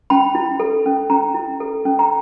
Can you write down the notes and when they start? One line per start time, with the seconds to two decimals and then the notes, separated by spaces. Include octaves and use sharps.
0.10 C#4 B5
0.35 E4
0.60 A4
0.86 C#4
1.10 C#4 A#5
1.34 E4
1.60 A4
1.85 C#4
1.99 A#5